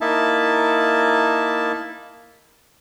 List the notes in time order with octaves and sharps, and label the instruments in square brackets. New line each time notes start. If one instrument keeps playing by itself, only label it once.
[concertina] A#3 D#4 E4 E5 A5